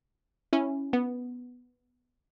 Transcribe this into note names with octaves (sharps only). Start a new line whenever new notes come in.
C#4 E4
B3